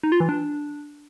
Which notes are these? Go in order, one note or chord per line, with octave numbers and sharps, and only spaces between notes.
D#4
F4
E3
D4